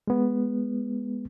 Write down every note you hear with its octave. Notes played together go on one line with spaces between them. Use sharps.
G#3 B3